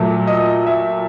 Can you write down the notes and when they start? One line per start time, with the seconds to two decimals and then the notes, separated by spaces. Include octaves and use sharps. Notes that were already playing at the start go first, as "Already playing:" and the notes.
Already playing: A#2 F#3 A3
0.27 D#5
0.67 E5